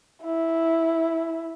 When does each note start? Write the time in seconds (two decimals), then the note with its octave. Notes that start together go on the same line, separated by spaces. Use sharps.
0.23 E4